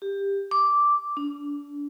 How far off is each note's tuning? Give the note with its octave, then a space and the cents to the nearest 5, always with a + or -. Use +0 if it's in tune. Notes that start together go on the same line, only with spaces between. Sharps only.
G4 +15
D6 -5
D4 -30